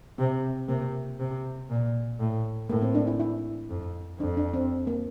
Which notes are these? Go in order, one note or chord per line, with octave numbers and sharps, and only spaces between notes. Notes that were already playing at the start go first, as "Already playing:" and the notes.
C3 C4
C3 A#3
C3
A#2
A2
A2 A#3
C4
D4
E4
E4
F2
F2 D4
D4
C4
A#3